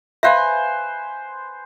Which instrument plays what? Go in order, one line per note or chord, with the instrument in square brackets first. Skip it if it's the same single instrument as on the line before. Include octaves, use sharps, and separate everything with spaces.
[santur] B4 C5 G#5 [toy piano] E5 F5